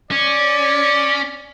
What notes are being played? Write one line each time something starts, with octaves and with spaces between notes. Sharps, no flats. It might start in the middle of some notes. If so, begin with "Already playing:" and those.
C#4 D5